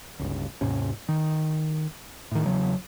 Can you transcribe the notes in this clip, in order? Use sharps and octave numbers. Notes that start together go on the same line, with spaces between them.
G1 C#2
D#2 G#2 C3 C#4
D#3
A2 D#3
E2 C#3 F#3